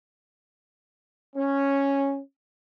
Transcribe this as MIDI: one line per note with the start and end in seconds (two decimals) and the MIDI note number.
1.35 2.19 61